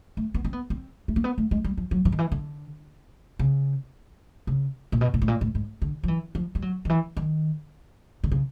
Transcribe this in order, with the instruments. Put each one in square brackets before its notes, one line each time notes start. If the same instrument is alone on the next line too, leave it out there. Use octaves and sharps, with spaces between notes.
[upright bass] A3
B3
C4
B3
C4
A3
A#3
B3
A3
G#3
G3
F3
F#3
F3
D#3
E3
D3
C#3
C#3
A#2
B2
A#2
A2
A#2
A2
G#2
D3
F3
E3
F3
G3
F#3
D#3
E3
D#3
D3
C#3